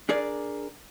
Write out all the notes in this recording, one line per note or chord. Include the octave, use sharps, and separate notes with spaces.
D4 G#4 A#4 D5